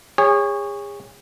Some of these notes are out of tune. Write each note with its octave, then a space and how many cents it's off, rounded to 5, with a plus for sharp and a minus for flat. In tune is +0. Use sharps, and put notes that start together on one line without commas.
G#4 -35 C#5 +0